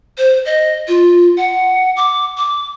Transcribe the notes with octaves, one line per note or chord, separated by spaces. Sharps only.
C5
D#5
F4
F#5
D6
D6